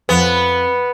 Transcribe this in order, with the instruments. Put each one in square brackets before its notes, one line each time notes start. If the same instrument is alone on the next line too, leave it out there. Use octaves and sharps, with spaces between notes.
[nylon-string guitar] F2 [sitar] B3